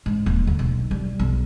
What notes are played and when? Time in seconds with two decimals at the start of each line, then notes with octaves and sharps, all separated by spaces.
0.06 G#2
0.26 D#1
0.47 D2
0.59 B1
0.91 G3
1.19 B1